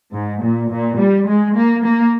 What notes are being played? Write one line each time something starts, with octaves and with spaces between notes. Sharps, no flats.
G#2
A#2
A#2
G3
G#3
A#3
A#3